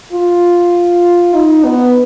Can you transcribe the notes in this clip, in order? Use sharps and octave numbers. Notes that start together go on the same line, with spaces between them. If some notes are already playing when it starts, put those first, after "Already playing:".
F4
D#4
B3